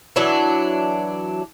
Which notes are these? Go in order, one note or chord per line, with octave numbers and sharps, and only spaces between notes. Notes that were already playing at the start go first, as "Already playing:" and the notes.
E3 F#3 D4